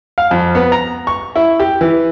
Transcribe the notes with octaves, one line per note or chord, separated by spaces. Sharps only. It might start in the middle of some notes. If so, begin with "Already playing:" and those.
F5
F2
B3
A#5
C#6
E4
G4
E3